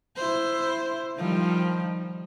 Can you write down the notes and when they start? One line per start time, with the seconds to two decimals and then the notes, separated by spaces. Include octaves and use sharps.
0.16 E4 C5
1.17 D#3 F3 G3